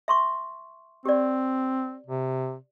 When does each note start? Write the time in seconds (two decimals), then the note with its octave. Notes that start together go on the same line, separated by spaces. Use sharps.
0.08 E5 C6 C#6
1.05 C4 G4 D5
2.06 C3